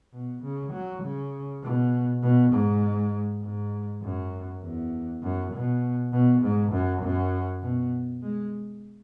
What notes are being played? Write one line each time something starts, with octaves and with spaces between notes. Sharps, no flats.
B2
C#3
F#3
C#3
B2
B2
G#2
G#2
F#2
E2
F#2
B2
B2
G#2
F#2
F#2
B2
G#3